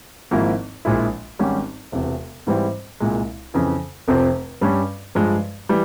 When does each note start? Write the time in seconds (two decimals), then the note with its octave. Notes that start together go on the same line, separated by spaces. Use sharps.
0.31 G#1 G#2 F3 A#3 E4
0.85 A#1 A#2 F3 G#3 E4
1.39 G#1 G#2 G3 C#4 G4
1.92 E1 E2 C3
2.47 G#2 E3 G3 C4 E4
3.00 C2 A#2 G#3
3.54 F2 C#3 E3
4.08 F1 F2 C3 F3 C4
4.61 G2 G3 C#4
5.15 G2 F3 G#3
5.69 E3 G3